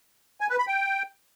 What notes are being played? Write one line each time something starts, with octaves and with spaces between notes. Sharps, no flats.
G#5
B4
B5
G5